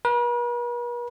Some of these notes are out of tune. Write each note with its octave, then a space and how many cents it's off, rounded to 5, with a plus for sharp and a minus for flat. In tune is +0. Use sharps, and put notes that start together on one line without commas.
B4 -45